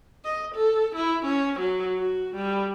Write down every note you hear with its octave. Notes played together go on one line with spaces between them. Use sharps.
D#5
A4
E4
C#4
F#3
F#4
G3